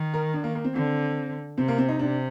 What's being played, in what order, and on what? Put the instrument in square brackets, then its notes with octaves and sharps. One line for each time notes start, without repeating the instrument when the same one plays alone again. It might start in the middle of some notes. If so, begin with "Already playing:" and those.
Already playing: [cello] D#3
[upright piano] A#4
D4
A#3
A#3
C4
[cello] D3 [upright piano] C4
[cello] C3 [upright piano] C4
[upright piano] A#3
C4
D#4
[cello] C3 [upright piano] D4